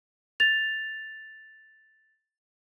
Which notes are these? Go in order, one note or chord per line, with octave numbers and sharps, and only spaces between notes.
A6 F7